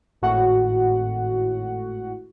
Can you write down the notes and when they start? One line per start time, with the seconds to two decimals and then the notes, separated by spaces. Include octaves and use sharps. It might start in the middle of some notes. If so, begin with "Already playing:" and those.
0.22 G#1 A2 F#4 F#5